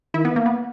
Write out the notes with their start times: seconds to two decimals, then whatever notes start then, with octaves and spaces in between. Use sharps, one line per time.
0.14 D#3 E4
0.25 B3
0.36 A#3
0.46 B3